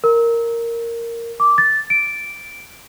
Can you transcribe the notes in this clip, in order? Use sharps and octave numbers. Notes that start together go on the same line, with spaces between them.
A#4
D6
A6
D7